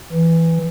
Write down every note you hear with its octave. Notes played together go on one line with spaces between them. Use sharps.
E3